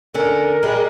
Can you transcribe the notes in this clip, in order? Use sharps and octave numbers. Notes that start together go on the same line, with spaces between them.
D3 C#4 A#4
G3 G#3